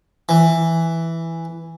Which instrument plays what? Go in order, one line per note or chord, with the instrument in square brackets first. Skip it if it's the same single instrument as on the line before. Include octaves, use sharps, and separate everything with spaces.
[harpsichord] E3